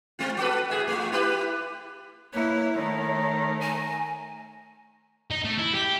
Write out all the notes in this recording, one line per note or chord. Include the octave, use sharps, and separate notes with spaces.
G#3 C4 F4
F#4 A4 B4
A2 G#4 E5
A3 F4
E4 G4 B4
A#3 E4 B4 C#5
D#3 A3 A#5
G#5
D#4
A3
E4
G4